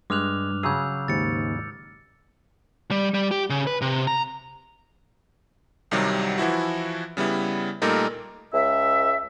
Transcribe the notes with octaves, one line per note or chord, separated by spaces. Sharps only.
G2 G#3 D6 F6 F#6 F7
C#3 F#3 G#4 E6 G6
D#2 G#2 A6 C#7
G3
G3
G4
C#3
B4
C3
A#5
C2 C3 D#3 F#3 G3
E3 F3 E4 F#4
C#3 G3 B3 E4
A#2 G3 A3 A#3 D#4 A#4
C#2 E5